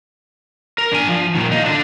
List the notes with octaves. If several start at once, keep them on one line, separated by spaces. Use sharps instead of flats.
A#4
D4 G#5
F3
A#2 D#3
D#4 F4
D3 D4